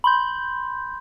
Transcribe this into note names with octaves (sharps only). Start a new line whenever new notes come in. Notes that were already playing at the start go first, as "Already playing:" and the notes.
B5 C6 G6